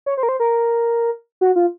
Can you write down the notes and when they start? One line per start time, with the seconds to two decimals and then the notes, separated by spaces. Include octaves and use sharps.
0.06 C#5
0.17 C5
0.23 A#4
0.29 C5
0.40 A#4
1.41 F#4
1.56 F4